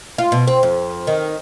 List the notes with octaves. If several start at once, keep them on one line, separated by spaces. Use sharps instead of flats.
F4
B2
C4
F2
D#3